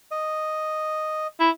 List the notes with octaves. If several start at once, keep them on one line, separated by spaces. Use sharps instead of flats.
D#5
E4